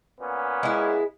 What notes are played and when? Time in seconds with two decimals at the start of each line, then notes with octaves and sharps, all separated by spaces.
0.20 A#2 B3 C#4
0.63 G#3 E4